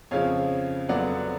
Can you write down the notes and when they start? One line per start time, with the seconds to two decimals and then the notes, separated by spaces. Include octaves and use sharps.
0.11 F2 C#3 F3 C#5 F5
0.89 F2 D3 F#3 B3 D5 F#5